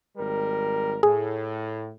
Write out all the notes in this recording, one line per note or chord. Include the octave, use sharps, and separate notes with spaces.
G#1 G3 A#4
A2 G#4